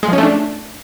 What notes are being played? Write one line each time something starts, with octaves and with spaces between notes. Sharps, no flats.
G#3
F3
C#4
A3
D4